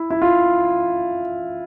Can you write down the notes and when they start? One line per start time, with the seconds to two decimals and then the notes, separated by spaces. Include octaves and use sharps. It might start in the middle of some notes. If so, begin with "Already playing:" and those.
Already playing: E4
0.10 E4
0.22 F4